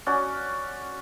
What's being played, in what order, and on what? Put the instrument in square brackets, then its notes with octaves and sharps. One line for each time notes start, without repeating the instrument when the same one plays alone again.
[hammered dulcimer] C#4 F#4 D5